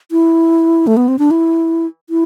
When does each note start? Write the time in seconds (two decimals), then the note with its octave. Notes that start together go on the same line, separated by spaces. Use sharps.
0.11 E4
0.87 A3
0.97 B3
1.08 C4
1.19 D4
1.31 E4
2.10 E4